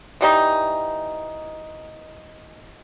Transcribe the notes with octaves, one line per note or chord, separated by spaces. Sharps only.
E3 G3 D#4